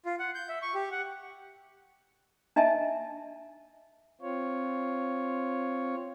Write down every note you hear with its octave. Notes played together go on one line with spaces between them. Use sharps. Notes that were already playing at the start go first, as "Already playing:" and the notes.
F4
F#5
G6
E5
C#6
G4
F#5
D4 D#5 E5 G#5 A5
C4 F4 C#5